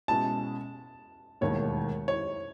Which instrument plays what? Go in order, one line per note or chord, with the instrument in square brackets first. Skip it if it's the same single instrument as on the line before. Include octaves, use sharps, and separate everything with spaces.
[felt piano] B2 G#3 C#4 E4 [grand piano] A5
[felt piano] E1 D#2 D#3 A3 [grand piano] C#5
[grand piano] C#5